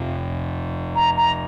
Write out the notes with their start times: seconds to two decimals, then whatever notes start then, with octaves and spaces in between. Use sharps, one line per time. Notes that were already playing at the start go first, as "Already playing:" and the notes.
Already playing: F2 C3 F3
0.95 A#5
1.17 A#5